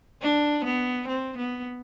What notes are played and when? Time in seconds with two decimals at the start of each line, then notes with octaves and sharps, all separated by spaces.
0.22 D4
0.65 B3
1.08 C4
1.37 B3